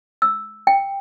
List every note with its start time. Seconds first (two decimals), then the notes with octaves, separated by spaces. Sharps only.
0.22 E6
0.67 G5